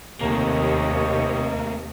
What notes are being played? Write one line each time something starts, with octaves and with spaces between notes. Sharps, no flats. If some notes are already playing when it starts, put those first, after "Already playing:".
D#2 C3 A3 A#3 G4 C#5 D#5